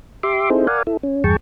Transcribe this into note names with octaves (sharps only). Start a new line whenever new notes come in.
G4 E5 C6 D6
C4 D#4 E4 G#4 A4 C5
A#4 D5 F5 F#5 G#5
E4 A4
C#4
E2 G2 G#4 G5 A5 C#6